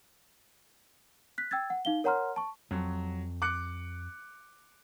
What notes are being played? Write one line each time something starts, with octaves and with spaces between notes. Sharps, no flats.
F#6 B6
G5 E6 G#6 A6
F#5
D#4 F5 G7
A#4 C#5 F#5 A#5 C6 F6
A5 C#6
F2 F#3
D6 F#6 C#7